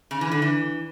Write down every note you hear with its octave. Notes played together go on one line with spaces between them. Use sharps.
C#3
E3
D3
E3